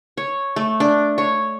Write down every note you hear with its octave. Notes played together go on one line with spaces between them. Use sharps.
C#5
A3
D4
C#5